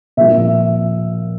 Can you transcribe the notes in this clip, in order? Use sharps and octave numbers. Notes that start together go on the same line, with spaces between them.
A#2 F3 E5